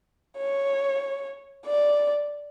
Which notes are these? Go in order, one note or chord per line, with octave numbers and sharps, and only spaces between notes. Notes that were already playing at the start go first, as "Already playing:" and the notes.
C#5
D5